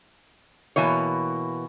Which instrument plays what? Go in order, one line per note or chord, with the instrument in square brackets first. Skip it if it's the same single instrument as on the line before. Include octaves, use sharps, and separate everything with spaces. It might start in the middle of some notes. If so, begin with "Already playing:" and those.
[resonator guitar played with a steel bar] B2 E3 A#3 C#5